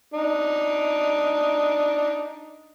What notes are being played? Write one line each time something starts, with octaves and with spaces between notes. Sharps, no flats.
D4 D#4